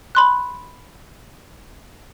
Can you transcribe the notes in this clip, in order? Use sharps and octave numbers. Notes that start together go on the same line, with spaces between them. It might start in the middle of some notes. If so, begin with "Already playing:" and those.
B5 C6 F#6